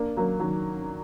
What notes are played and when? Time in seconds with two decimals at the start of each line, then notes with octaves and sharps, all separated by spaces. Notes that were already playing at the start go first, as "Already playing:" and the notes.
Already playing: A#3 D4
0.17 F#3 A#3
0.40 D#3 F#3